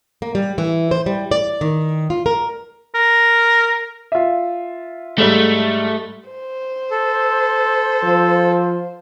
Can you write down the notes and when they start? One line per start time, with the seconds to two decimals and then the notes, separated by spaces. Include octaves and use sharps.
0.22 A#3
0.35 G3
0.58 E3
0.91 C5
1.06 G3
1.31 D5
1.61 D#3
2.10 F4
2.26 A#4
2.95 A#4
4.12 F4 E5
5.18 G#2 G3 A3
6.29 C5
6.91 A4
8.04 F3